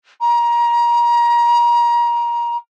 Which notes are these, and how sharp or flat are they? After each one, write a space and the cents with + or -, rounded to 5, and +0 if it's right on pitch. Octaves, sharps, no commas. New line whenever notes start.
A#5 +30